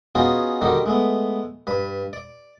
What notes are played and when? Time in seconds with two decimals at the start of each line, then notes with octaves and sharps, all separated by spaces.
0.15 B3 C#4 D#4 F4 F#4 G#4
0.62 D3 D#3 G3 D#4 F#4
0.86 G#3 A3 B3
1.67 G2 B4
2.13 D5